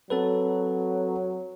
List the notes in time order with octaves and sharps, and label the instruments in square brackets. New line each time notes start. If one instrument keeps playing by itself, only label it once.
[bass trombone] F#3 [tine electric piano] C4 A4 B4